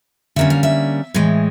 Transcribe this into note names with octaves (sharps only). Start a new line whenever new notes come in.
D3 G3 A#3 C#4 E5
F5
E5
A2 E3 G#3